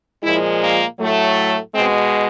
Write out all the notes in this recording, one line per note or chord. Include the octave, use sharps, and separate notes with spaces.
A#2 F3 G#3 E4
A#3
A2 F#3 A3
B2 G#3 C4